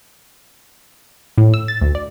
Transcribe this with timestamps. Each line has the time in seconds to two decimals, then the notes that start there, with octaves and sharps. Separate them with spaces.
1.38 A2
1.54 E6
1.68 A6
1.82 D2
1.95 D5